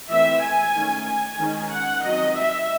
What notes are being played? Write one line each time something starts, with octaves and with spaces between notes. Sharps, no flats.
E3 A3 C4 E5
G#5
D#3 A3 C#4
G#5
D#3 G#3 C#4
F#5
D#3 F#3 C4 D#5
E5